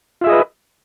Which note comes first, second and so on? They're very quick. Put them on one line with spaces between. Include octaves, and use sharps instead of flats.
F4 E5 G#4 D#5 B4